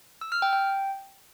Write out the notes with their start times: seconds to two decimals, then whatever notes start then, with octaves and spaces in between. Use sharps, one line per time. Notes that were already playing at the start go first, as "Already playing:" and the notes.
0.21 E6
0.32 F6
0.42 G5
0.53 G5